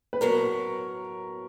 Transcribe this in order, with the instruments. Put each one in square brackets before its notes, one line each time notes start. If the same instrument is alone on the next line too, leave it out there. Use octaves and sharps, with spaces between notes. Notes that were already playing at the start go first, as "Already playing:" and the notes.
[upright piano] B4
[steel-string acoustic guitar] A2 F#3 B3 [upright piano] A#4